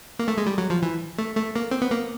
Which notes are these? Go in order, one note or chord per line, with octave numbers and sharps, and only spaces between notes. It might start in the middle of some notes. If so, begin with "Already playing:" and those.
A#3
A3
G#3
G3
F#3
F3
E3
A3
A3
A#3
C4
B3
A#3